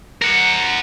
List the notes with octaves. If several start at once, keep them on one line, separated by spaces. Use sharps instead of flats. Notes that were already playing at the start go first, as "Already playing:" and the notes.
A#4 F#5